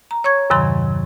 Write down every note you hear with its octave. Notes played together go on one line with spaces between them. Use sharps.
A#5
C#5 C#6 G#6
E2 G2 C3 D#3 F#3 C6